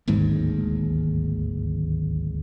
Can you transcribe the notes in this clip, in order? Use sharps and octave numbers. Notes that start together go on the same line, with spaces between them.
D1 G#1 D#2 G#2